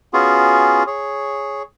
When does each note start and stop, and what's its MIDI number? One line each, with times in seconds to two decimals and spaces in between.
0.13 0.83 59
0.13 0.83 61
0.13 0.83 65
0.13 0.83 66
0.13 0.83 68
0.87 1.63 68
0.87 1.63 73